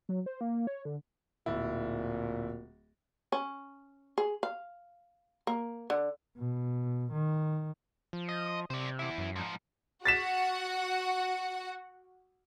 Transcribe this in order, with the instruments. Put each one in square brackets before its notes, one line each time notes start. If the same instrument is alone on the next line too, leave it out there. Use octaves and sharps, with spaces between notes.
[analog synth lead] F#3
C5
A#3
C#5
D3
[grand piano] D1 E4 [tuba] A#2
[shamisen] C#4
G#4
F5
A#3
D3
[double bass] B2
D#3
[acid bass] F3
[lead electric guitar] D#5
[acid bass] C3 [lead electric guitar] C5 D5
[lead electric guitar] E2 E4
[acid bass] F#2
[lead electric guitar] G#2 F3
[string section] F#4 F#5 [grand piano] A6 B6 E7